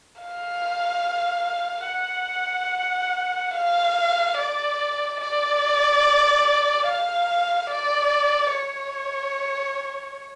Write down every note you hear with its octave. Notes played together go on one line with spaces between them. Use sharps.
F5
F#5
F5
D5
D5
F5
D5
C#5